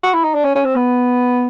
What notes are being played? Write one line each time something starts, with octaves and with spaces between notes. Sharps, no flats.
F#4
E4
D#4
D4
C#4
C#4
C4
B3